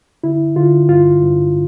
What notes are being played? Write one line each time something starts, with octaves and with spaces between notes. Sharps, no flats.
D3 E4
D3 F4
G2 F4
G2